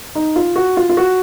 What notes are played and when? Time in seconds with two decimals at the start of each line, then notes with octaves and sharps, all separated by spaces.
0.15 D#4
0.36 F4
0.56 F#4
0.77 F4
0.89 F4
0.97 F#4